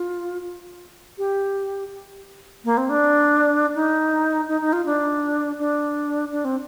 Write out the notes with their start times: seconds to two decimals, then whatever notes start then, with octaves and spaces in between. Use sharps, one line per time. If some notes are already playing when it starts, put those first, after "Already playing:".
Already playing: F4
1.18 G4
2.65 A#3
2.77 C4
2.89 D4
3.75 D#4
4.49 D#4
4.61 D#4
4.73 F4
4.86 D4
5.59 D4
6.32 D4
6.45 C4